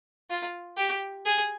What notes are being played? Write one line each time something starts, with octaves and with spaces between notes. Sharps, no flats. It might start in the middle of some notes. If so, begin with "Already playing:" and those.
F4
G4
G#4